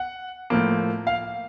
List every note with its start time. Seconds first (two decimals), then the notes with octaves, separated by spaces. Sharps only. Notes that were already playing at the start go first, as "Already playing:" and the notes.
Already playing: F#5
0.50 A2 F3 A#3
1.07 F5